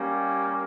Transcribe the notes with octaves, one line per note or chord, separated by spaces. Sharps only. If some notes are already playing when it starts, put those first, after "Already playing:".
Already playing: G3 A#3 C#4